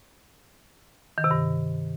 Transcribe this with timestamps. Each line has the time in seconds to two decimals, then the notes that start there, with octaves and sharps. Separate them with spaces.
1.18 D#3
1.24 C3
1.31 G2